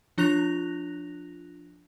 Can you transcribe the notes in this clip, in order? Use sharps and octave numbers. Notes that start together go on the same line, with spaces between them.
F3 D4 F4 F#6 A#6 F7